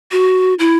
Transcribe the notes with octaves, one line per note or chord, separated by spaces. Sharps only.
F#4
E4